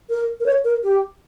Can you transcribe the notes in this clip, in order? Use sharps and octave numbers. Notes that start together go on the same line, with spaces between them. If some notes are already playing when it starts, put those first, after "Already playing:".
A#4
A#4
C#5
A#4
G4